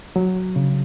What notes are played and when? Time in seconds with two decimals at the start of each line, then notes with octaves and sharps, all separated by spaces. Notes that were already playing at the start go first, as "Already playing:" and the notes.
0.16 F#3
0.56 C#3